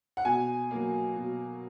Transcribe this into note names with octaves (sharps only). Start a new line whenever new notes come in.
F#5
B2 G#5
F#3 A#3
B2